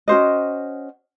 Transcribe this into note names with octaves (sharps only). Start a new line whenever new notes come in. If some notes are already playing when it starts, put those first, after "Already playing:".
C#4 F#4 C5 D#5